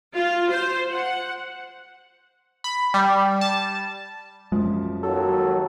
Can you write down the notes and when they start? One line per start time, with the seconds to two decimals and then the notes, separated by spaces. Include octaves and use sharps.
0.16 F4
0.49 C5
0.92 F#5
2.64 B5
2.94 G3
3.41 A5
4.52 F#2 F3 G#3
5.03 D#2 F#3 A4